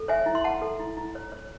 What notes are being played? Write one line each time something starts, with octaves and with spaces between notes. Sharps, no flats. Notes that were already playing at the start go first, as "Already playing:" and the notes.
Already playing: A4
C#5 E5 G#5
E4
C6
E4 F#5 A5
A4
E4
E4
C#5
C#5